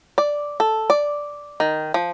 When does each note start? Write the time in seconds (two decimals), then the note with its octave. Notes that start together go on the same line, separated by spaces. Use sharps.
0.18 D5
0.60 A4
0.90 D5
1.60 D#3
1.94 F3